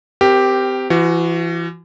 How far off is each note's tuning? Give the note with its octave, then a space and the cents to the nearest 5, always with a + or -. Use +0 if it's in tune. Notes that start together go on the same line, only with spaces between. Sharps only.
C4 -25 G4 +0 A#4 +0
E3 +35 F#4 +0